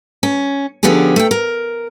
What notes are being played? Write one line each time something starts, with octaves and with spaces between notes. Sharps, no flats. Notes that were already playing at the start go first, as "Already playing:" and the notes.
C#4
D3 F3 B3 C#4 G4 G#4
A3 G5
A#4